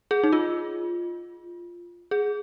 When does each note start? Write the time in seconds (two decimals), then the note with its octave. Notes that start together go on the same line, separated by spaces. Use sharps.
0.11 G#4
0.24 D#4
0.33 F4
2.11 G#4